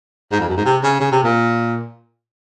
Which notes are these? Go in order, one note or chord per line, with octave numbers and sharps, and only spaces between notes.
G#2
F2
F#2
G#2
C3
C#3
C#3
C3
A#2